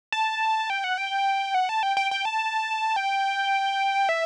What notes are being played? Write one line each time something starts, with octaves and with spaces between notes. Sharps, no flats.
A5
G5
F#5
G5
F#5
A5
G5
G5
G5
A5
G5
E5